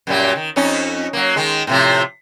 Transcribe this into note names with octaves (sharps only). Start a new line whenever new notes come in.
F#2 A#2 G3
D#3
F2 C#4 D#4
F#3 A#3
D#3 G#3
A2 C3 F3